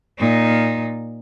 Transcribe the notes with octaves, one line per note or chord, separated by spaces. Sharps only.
A#2 D#4